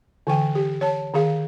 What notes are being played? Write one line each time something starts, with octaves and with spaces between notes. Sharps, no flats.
D3 E3 G5
G4
C#5 A5
D#3 G#4 F5